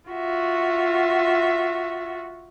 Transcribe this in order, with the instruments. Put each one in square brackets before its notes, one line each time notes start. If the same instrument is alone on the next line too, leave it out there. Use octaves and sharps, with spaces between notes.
[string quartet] F4 F#4 E5